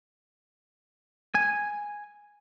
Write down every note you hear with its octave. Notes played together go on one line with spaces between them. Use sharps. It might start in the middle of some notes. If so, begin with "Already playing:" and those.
G#5